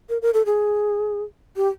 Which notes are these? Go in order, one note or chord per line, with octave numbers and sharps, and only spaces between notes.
A#4
A#4
A4
G#4
G4